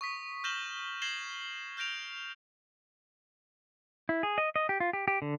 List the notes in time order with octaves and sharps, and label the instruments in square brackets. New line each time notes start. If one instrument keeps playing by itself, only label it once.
[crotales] C#6 D#6 B6
F6 G6 A#6 E7 F#7 G7
G#6 A#6 C7 E7 F#7 G7
F6 G6 A#6 D7 F7
[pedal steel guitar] E4
G#4
D#5
D#5
G4
F4
G4
G4
D3